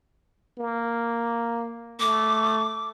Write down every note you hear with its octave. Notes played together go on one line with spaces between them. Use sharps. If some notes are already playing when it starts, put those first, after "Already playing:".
A#3
A3 D6